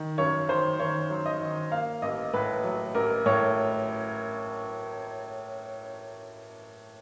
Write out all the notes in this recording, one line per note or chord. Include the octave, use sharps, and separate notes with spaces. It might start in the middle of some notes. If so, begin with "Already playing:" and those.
Already playing: D#3
F#2 C#5
D#3 C5
D#3 C#5
F#3
D#5
D#3
A#3 F5
A1 D#5
A2 B4
F#3
A1 A#4
A2 C#5